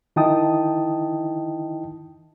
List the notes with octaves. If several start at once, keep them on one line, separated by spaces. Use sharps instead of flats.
D#3 D#4 E4 G5 A5 D#6